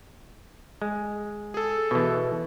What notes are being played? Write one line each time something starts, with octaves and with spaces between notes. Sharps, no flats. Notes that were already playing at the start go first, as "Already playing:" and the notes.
G#3
G#4 A4
B2 E3